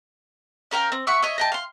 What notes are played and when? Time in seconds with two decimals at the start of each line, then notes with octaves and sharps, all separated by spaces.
0.71 C#4 A#4 F5 G5
0.92 C4
1.07 E5 F#5 C#6 E6
1.22 C#5 D#5 E5
1.38 D#5 G5 A5
1.52 F5 C6